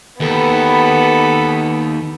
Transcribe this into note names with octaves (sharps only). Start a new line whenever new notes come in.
D#2 B3 A4 B4 B5